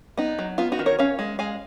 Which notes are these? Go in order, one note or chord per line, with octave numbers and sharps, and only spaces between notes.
B3 D#4
F#3
B3 F4
D#4 F#4
D#3
A#4 C#5
C#4 C#5 F5
G#3
G#3 F5 G#5